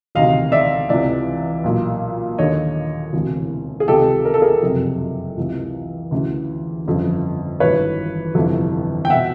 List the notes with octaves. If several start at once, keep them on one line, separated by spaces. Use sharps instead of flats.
E1 D2 C3 D#3 D#5 F5
D5 E5
C#2 C3 E3 D5 E5
B1 A#2
D#2 D3 C#5 D#5
E1 D2 C3 E3
G#4
C#2 C3 D#3 G4 A4
A#4
A4
G#4 A#4
F#1 F2 C3
C#2 C3 E3
D2 C#3 E3
G1 F2 C#3
G#1 G2 E3 B4 C#5
G1 F2 C3 E3
G5
B2 E5 F#5